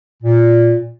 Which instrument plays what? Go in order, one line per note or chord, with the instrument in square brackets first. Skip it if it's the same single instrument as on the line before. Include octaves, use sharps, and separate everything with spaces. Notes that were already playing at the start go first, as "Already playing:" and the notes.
[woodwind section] A#2